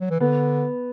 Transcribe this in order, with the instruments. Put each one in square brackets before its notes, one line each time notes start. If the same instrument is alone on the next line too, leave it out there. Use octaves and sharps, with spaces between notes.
[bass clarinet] F#3
E3
[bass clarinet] D3 [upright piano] B3